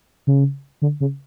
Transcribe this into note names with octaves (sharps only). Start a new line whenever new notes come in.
C#3
D3
C#3